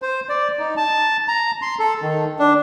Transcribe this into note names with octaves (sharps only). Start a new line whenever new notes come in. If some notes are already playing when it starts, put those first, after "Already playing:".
C5
D5
D#4
A5
A#5
C6
A4
D#3
D4